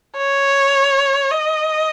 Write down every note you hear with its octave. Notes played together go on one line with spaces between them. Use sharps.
C#5
D#5